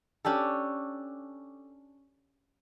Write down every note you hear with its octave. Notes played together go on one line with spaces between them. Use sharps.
C#4 D4 G4 A4